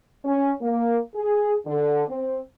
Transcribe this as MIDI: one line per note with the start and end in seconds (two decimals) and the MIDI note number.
0.25 0.52 61
0.62 0.97 58
1.16 1.54 68
1.66 2.04 50
2.08 2.39 60